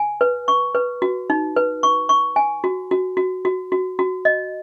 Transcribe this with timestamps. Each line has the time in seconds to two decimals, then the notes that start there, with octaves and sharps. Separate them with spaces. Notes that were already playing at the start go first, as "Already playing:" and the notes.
Already playing: G#5
0.21 B4
0.48 C#6
0.75 B4
1.02 F#4
1.30 D#4
1.56 B4
1.83 C#6
2.09 C#6
2.36 G#5
2.64 F#4
2.91 F#4
3.17 F#4
3.45 F#4
3.72 F#4
3.99 F#4
4.25 D#5